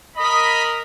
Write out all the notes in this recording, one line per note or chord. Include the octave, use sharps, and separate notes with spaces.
A#4 D#5 B5